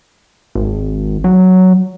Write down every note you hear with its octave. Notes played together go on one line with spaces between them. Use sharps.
G#1
F#3